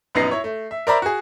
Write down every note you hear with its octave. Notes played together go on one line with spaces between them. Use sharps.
A#1 F#2 B3 D#4 A#6 C7
E4 C#5
A3
E5
A#4 C5 D5 E5 A#5 B5
F#4 G#4